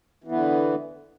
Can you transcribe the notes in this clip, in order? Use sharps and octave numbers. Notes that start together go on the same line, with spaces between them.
D3 E3 B3